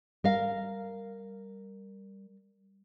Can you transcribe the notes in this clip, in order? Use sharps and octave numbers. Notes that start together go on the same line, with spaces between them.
G3 A#4 F5